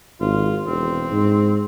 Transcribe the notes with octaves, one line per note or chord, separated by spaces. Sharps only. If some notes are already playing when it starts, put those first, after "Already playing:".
G#1 F4
E1 C4
G#2